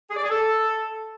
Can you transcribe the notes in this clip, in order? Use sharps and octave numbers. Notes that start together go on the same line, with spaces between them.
G#4
D5
G#4
A4